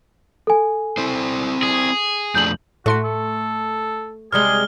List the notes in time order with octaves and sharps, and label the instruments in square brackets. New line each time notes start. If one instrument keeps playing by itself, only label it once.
[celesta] A4 G#5
[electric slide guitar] C4 E4 C5
[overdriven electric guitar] G#4
[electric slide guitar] F2 A3 D4 [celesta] G6 F#7
[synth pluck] A2 C6 C#7 [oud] A3 [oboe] F#4
[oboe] A4
[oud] C3 G3 G#3 [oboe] G#4 [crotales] F6 G7